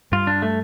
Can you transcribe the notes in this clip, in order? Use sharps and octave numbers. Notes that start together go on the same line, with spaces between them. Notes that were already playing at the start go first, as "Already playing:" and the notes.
G2 G3 F4
D4
A3